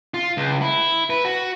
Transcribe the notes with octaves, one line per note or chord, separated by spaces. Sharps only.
F4
C#2
E4
B4
F#4